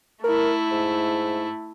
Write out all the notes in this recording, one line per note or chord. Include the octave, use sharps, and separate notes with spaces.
A3 E4 A#4
G#2